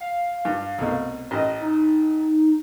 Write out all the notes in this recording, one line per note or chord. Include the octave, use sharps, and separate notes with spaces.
F5
G2
C2 B2 A3
A1 D#5
D#4